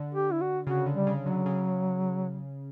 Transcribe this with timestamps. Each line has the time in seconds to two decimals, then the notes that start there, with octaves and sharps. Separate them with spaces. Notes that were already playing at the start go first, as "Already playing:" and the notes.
Already playing: D3
0.15 G4
0.32 E4
0.41 F#4
0.67 C#3 F#4
0.86 D3
0.93 G3
1.07 C#3
1.19 F#3
1.26 D3
1.46 C#3